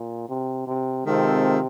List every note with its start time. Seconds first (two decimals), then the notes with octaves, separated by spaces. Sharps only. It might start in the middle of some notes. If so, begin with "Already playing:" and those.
Already playing: A#2
0.29 C3
0.67 C3
1.06 C3 D#3 G#3 C4 F4 A4